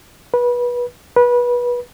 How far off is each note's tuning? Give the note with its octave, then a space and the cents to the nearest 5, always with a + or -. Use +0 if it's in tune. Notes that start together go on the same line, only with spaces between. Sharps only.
B4 -25
B4 -25